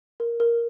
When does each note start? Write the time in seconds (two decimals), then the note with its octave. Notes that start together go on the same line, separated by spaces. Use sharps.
0.20 A#4
0.40 A#4